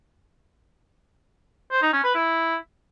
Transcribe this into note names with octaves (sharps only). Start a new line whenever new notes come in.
C5
D#4
C#4
B4
E4